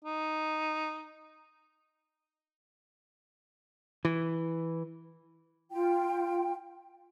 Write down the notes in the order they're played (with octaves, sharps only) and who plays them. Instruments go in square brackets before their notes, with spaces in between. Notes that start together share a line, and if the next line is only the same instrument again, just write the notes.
[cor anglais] D#4
[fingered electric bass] E3
[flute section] F4 G5